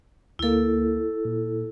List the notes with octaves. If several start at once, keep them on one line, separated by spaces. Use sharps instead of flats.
D2 A#3 E4 A4
A#2